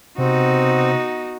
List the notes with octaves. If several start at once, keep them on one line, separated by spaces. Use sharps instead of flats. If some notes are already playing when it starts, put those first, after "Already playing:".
C3 B3 C4 D#4 F#4